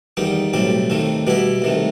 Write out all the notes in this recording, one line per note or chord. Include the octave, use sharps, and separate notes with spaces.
E2 D#3 G3 D#4
B1 A2 G3 C4
D#2 D#3 A3 C4
B2 G3 B3 E4
C2 C3 D#3 A3